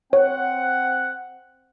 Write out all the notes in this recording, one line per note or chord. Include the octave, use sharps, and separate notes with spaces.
C4 C#5 F#5